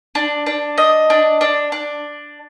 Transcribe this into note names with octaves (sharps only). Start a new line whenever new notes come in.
D4
D4
D#5
D4
D4
D4